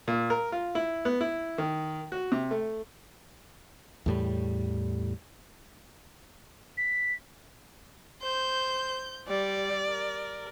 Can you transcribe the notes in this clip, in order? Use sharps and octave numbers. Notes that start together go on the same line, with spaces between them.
A#2
A#4
F4
E4
B3
E4
D#3
F#4
C3
A3
E2 A2 G3
B6
C5 G6
G3 D5
A#4